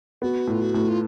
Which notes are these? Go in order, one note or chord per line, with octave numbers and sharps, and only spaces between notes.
B3 F#4
A2
F4
F#4
A2
F4